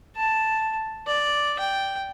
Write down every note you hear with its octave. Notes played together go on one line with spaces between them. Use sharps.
A5
D5
G5